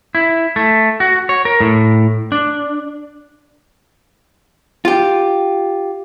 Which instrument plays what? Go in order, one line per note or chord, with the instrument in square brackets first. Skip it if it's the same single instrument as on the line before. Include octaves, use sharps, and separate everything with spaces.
[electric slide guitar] E4
A3
F#4
C#5
A#4
A2
D4
[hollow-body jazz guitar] F4 G4